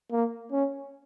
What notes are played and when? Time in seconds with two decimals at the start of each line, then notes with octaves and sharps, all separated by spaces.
0.11 A#3
0.51 C#4